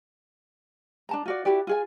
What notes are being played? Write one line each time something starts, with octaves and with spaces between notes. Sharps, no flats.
D4 A5 A#5
F4 F#4 D5
E4 F#4 G4 D5
F4 G#4 G#5